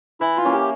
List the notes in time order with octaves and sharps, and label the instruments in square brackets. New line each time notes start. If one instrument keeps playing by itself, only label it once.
[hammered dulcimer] E3 [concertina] E4
[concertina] F4
[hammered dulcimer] A#3 C#4
[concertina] G4